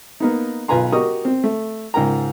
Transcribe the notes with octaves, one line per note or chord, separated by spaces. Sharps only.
A#3 B3 D#4
B1 F4 B4 G#5 A#5 C6
F#4 G4 A#4 D#5 C#6 D#6
C4
A3
C#2 G#2 A#4 G5 A#5